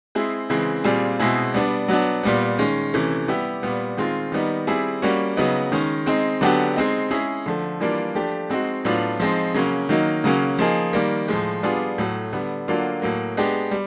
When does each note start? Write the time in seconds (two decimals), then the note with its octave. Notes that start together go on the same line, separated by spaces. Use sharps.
0.15 G#3 C4 E4 G#4
0.50 C#3 E3 G#3 C4
0.84 A#2 G3 C4 F4 G#4
1.19 B2 G#3 C4 E4 G#4
1.54 G3 B3 D4
1.88 F#3 B3 D4
2.23 A#2 G3 B3
2.59 D#3 G#3 C#4
2.93 C3 E3 A3 C#4
3.28 G3 B3 E4 G4
3.63 A#2 G3 B3
3.97 D#3 G#3 C4 F4
4.32 D#3 G3 B3 D#4
4.67 G3 C4 E4 G#4
5.02 G3 A#3 C#4 F#4
5.37 C#3 F#3 B3 D#4
5.72 D#3 G#3 C#4
6.06 G#3 C4 D#4
6.41 D3 F#3 B3 D4 G4
6.76 G#3 C4 D#4
7.11 G#3 C#4 E4 G#4
7.46 D3 F3 A3
7.80 E3 G3 A#3 D4 F4
8.15 F3 A3 D4 G4
8.50 G#3 C4 D#4 F#4
8.85 A2 F#3 B3 D4 F4
9.20 F3 G#3 C4 D#4
9.54 C#3 F#3 A#3 C#4
9.89 D#3 F#3 A#3 D#4
10.24 C#3 F#3 A#3 C#4
10.59 F3 A#3 D#4 G#4
10.93 D#3 G3 A#3
11.28 A2 F3 G#3
11.63 G3 B3 D4 F4 G#4
11.98 A2 F#3 A3
12.33 D3 G3 B3
12.68 D3 F#3 A#3 D4 F4
13.02 A2 F#3 A#3
13.37 G#3 B3 D4 G4
13.71 G3